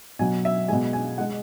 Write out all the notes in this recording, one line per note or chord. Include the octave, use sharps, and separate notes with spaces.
B2 F#3 G#5
E5
B2 G#3 G#5
G#5
G#3 F#5